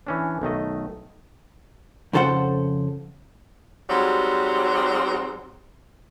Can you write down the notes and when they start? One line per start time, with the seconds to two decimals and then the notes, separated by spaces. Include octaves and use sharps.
0.07 E3 C#4 D4
0.42 B1 D#3 A3 D#5
2.13 F2 C#3 A4 C5 F#5
3.90 G#2 F#3 G3 C4